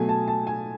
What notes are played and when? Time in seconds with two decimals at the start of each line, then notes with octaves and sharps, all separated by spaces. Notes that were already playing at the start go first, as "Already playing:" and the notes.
Already playing: B2 F#3 A3 G#5
0.09 A5
0.28 A5
0.47 G#5